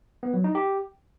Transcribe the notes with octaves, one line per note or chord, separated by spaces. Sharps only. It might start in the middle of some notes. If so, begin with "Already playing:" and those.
B3
F#3
D#4
G4